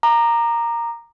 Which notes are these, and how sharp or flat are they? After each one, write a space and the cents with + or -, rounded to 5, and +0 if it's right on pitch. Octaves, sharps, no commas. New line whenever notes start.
A#5 +0 D6 +35